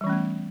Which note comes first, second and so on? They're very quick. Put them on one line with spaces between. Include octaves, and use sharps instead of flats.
G3 E3 C#4 A3 B3